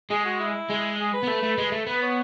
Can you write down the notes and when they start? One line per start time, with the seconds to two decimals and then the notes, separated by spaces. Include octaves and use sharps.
0.10 G#3 G#4
0.25 F#4
0.40 E4
0.70 G#3
0.99 G#4
1.14 B4
1.23 B3
1.28 A3
1.43 A3
1.58 G#3
1.72 A3
1.87 B3 B4
2.02 C#5